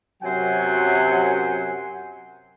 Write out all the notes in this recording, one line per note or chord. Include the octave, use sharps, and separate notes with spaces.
F#2 C3 F#3 C5 F#5 G#5